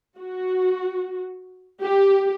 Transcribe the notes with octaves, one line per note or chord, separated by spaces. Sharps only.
F#4
G4